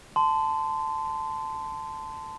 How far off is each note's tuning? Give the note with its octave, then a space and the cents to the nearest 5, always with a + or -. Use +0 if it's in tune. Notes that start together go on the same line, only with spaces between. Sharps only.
A5 +0 C6 -25